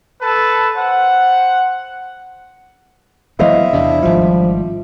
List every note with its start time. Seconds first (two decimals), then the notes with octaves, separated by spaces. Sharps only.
0.22 A4 B4 A5
0.76 C5 F#5
3.39 E3 F#3 B3 E4 C5 D#5 F5
3.73 E2 C3 D4
4.02 G#1 F3 G3